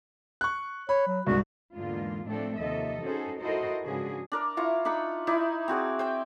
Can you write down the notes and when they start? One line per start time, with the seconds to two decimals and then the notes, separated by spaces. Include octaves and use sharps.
0.41 C#6 F#6
0.89 C#5 B5
1.07 F#3
1.27 C2 G#2 F#4
1.74 E2 G#2 D3 A#3 F4
2.26 A2 F3 A3 C4 D4 A4
2.57 D#2 C3 F3 A4 D#5 E5
3.03 C#4 D#4 F#4 G#4 A4 C5
3.40 E4 F#4 A4 A#4 C5 D#5
3.83 G#2 C#3 F3 D4 F#4 G#4
4.32 D4 A#4 D5
4.57 E4 F4 A#5 C#6
4.85 D4 D#4 B5 C#6
5.27 D#4 E4 D5
5.68 C4 F#4 G#4 D5
5.99 C5 G5 E6